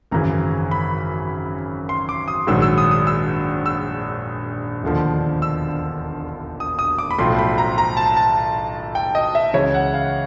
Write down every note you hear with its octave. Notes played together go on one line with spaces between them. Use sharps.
G#1 F#2 C#3 E3 A#5
B5
C6
D6
D#6
A#1 G#2 D#3 F#3 E6
E6
D#6
D#6
E6
E6
E1 D#2 D3 F3
E6
D#6
D#6
D6
B5
B1 A2 F3 C6
B5
A#5
A#5
A5
A5
G5
D#5
E5
C#2 C#3 E3 C#5
F#5
F5